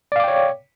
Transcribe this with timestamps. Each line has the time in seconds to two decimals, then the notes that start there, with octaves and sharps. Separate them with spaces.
0.12 D5
0.16 F5
0.20 D6
0.24 G5
0.28 C#5